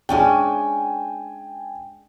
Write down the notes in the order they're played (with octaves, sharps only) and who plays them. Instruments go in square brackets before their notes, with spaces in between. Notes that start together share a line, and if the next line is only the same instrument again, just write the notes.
[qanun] G#3 C#4 D4 [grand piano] G5 G#5